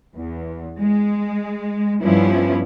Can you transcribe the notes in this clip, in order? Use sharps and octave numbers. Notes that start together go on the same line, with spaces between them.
E2
G#3
G2 F3 G3 B3 C#4 E4